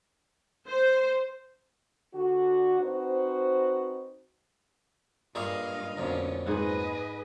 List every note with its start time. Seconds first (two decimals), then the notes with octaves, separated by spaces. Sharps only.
0.68 C5
2.14 D3 F#4
2.80 C4 D#4 F#4 B4 C5
5.35 G2 A#2 G#4 D#5 F5 D6
5.98 B1 F2 A#2 D3 C#4
6.46 G#2 G#4 B4 D#5 F#5